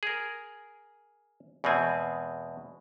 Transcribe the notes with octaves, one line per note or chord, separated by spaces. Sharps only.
G#4 A#4
E2 B2 G#3 C4 G#5